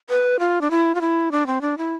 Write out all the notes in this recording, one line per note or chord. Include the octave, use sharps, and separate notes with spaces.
B4
F4
D4
E4
F4
E4
D4
C4
D4
E4